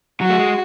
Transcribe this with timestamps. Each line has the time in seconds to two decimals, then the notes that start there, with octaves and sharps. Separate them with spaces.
0.21 F#3 F#4
0.30 A3
0.39 G#3